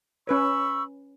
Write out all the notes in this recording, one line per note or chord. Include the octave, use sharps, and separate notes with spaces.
C#4 B4 C#5 B5 C#6 E6